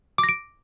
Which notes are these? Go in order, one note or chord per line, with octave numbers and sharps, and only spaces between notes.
D6
A#6
D7